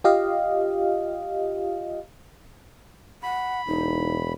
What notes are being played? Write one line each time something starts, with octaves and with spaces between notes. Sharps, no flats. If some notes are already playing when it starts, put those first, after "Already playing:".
F4 G4 D#5 F5
F#5 B5
E1 D#4